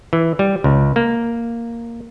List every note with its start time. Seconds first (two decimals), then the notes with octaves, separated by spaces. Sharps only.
0.13 E3
0.39 G3
0.64 C#2
0.96 A#3